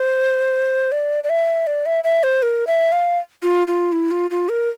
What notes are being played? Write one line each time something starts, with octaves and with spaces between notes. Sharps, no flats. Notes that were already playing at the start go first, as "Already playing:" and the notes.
Already playing: C5
D5
D5
E5
D5
E5
E5
C5
A#4
E5
F5
F4
F4
E4
F4
F4
A#4